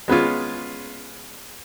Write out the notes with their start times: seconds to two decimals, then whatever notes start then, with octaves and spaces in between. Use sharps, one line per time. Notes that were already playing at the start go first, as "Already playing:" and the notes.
0.08 G#3 B3 C#4 F4